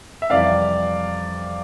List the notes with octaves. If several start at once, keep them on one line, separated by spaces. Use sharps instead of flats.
E5
F2 C3 E3 G3 D5 F5